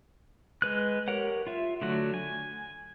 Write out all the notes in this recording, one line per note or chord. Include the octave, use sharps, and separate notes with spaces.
G#3 B4 F#6
G4 A#4 C#5 F#5
F4 E5
D3 F#3 A3 F#4
G#5